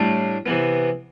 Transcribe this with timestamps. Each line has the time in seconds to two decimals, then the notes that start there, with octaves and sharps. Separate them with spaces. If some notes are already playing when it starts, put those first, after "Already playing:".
Already playing: A2 G3 D4
0.46 C3 E3 B3